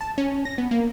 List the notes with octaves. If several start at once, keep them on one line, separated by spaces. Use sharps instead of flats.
A5
C#4
A#6
B3
A#3